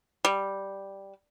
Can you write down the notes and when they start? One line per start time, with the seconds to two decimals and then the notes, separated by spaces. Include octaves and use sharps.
0.25 G3